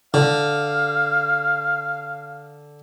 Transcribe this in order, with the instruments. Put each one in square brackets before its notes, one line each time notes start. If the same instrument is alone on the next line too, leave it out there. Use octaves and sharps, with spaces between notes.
[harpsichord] D3 [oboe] F5